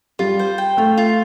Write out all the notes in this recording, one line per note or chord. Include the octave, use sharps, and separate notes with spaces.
G3 F4
C5
G5
A3 F4
F4